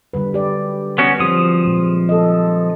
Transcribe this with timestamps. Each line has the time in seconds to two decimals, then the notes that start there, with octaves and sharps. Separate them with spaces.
0.13 D3 G3 B4
0.33 F#3 G4 D5
0.98 B3 C#4 F#4
1.19 F3 F#3 C4 G4 D#6
1.65 A#2 G#3
2.09 A4 D#5